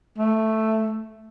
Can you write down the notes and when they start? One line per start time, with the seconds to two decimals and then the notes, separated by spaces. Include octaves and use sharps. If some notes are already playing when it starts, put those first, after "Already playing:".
0.18 A3